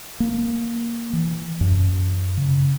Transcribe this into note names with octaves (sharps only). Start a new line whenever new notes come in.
A#3
E3
F#2
C#3